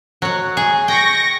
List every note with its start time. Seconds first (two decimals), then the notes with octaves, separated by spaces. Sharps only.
0.22 F#3 F#5
0.57 G#4
0.88 G5 C#6 A#6